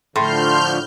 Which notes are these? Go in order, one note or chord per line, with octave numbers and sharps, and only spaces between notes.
A2 D3 F3 A3 C6 F6 G6